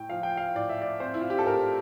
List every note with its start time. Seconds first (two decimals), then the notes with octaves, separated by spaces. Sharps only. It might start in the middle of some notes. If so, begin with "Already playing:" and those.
Already playing: A2 G5
0.10 F3 F5
0.23 G5
0.37 F5
0.55 A2 D5
0.69 E5
0.82 D5
1.00 C4 C5
1.14 E4
1.21 F4
1.30 G4
1.39 A4
1.46 A2 A#4